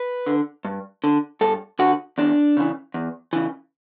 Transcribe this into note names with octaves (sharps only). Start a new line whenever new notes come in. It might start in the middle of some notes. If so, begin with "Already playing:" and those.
Already playing: B4
D3
G2
D3
G2 A4
D3 F#4
E2 D4
C#3 E3
E2
C#3 E3